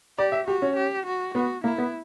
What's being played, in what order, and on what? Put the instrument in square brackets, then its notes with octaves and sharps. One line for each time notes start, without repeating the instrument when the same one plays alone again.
[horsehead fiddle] G4 [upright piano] D5
[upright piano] E5
[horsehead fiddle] F#4 [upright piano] G4
[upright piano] C#4
[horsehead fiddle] G4
F#4
[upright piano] B3 [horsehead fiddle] F#4
[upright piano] A#3 [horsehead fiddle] E4
[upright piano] B3